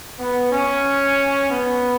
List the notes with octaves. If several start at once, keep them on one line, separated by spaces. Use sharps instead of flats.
B3
C#4
B3